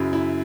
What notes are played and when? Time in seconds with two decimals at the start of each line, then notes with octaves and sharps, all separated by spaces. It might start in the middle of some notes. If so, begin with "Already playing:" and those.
Already playing: F#2 C#3 F#3 E4
0.13 E4